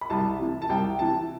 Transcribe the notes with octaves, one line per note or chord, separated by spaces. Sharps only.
B5
C2 A5
C3 E3
A5
C2 G5
C3 E3 A5